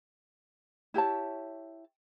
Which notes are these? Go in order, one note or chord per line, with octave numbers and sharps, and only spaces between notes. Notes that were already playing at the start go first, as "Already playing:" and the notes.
E4 G4 C#5 A5